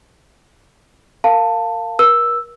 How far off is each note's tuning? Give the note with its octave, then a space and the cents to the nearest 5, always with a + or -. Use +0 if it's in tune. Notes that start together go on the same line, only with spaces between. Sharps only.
A#4 -25 F5 +0 A5 +15
A#4 +40 E6 +0